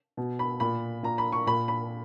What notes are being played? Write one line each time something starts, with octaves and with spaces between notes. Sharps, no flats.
B2
B5
A#2 B5
A#2 A#5
B5
C#6
A#2 B5
B5